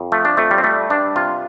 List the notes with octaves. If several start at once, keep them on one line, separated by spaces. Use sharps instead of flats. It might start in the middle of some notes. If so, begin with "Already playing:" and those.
Already playing: F2
F3 A3
D4
F2 A3
G3
C4
G3 A3
G2 D4
C3 F4